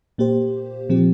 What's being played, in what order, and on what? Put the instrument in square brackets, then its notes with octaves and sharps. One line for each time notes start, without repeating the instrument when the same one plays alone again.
[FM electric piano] A#2 A#3 G4 C5
A#2 F3 C4 G4